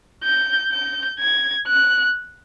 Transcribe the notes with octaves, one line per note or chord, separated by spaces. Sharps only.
G6
G6
G#6
F#6